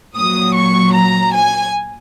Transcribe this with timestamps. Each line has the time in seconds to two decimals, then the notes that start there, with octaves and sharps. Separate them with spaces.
0.16 A#2 F#3 D#6
0.55 C#6
0.94 A#5
1.32 G#5